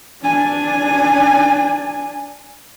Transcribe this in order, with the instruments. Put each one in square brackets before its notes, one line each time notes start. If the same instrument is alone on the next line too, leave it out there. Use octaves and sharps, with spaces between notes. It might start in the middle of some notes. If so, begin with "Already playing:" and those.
[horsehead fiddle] D4 G#5